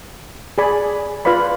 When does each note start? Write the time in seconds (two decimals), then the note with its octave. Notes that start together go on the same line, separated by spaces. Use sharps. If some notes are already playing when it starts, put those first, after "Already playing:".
0.58 G#4 D5 G#5 B5
1.25 F4 B4 D5 F5 B5